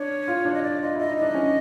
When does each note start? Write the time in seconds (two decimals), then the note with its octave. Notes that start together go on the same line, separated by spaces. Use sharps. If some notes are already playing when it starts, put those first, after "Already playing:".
Already playing: D4 C#5
0.28 F4
0.45 D4
0.54 D#5
0.63 D5
0.81 F4 D#5
0.95 E4 D#5
1.09 D#4
1.17 D4 D#5
1.34 C#4